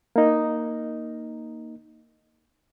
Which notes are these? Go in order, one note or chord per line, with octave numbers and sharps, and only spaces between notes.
A#3 D#4